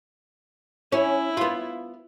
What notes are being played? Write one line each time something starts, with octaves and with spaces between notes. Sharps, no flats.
C#4 E4
B3 F4